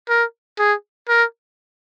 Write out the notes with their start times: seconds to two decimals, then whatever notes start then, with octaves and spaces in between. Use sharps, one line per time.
0.09 A#4
0.59 G#4
1.09 A#4